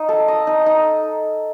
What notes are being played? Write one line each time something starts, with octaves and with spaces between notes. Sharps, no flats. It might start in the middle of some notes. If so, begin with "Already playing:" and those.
Already playing: D#4
A4
D#5
D#4
D#4